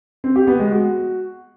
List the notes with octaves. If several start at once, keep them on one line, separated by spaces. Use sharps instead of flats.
C4
G4
B3
G#3
F#4